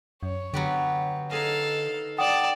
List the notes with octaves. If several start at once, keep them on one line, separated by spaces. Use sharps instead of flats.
F#2 C#5
D3 F#3 B3 G4
D#4 G#4 A4 D#5 F5
D5 F#5 G5 A5 D#6